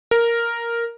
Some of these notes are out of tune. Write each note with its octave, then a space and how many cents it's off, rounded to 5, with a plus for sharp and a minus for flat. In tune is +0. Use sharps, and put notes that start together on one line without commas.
A#4 +0